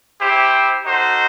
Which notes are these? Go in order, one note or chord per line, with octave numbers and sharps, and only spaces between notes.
E4 G4 C5
D#4 F#4 A4 C5